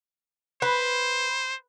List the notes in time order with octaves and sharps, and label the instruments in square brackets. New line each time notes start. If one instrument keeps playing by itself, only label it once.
[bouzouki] B4 [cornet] C5